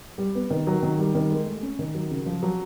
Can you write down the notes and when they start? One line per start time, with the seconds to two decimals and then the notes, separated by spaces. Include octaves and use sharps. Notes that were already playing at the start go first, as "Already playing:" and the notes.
0.18 G3
0.35 B3
0.50 D#3
0.67 F#3
0.82 D#3
0.99 G3
1.15 D#3
1.30 G#3
1.46 A3
1.62 C#4
1.79 D#3
1.95 F#3
2.10 C#3
2.26 F3
2.43 F#3